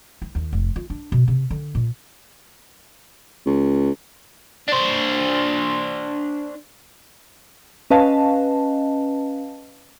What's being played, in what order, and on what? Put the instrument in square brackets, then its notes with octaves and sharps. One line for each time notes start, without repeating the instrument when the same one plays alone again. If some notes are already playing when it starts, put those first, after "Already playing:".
[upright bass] E4
D#2
F1
F4
D4
B2
C3
D3
A#2
[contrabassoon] C#2
[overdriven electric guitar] D4 C5
[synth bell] C#4 B4 D#5 F5 A5